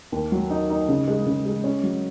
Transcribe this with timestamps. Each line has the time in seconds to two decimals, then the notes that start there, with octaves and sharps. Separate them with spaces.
0.12 D#2
0.32 F#3
0.50 D#4
0.70 D#4
0.89 C#3
1.08 G#3
1.26 C#3
1.46 G#3
1.64 C#4
1.84 F#3